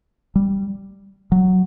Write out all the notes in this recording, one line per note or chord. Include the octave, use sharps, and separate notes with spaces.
G3
F#3